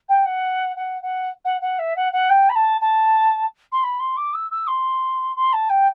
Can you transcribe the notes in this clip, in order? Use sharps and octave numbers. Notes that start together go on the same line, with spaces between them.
G5
F#5
F#5
F#5
F#5
F#5
E5
F#5
F#5
G5
B5
A5
A5
C6
B5
C6
D6
E6
E6
C6
C6
A5
G5